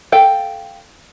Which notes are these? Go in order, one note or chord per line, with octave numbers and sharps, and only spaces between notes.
A4 F5 G5